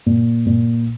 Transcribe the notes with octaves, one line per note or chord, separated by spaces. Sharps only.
A#2
A#2